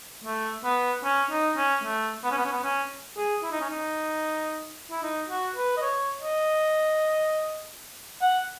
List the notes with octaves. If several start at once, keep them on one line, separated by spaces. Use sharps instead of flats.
A3
B3
C#4
D#4
C#4
A3
B3
C#4
B3
C#4
B3
C#4
G#4
E4
D#4
C#4
D#4
E4
D#4
F#4
B4
D#5
C#5
D#5
F#5